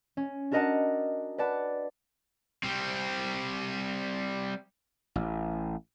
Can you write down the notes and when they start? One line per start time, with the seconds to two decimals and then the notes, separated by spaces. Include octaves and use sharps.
0.17 C#4
0.52 D4 F#4 A#4 D#5 F#5 A5
1.38 B4 D5 F#5 A5
2.63 G3 C4
5.16 A1